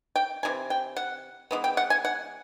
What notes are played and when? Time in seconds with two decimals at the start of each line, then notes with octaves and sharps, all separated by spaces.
0.16 G5
0.43 C3 E3 G#5
0.70 G5
0.96 F#5
1.51 E3 G#3 B3
1.64 G5
1.77 F#5
1.90 G#5
2.05 F#5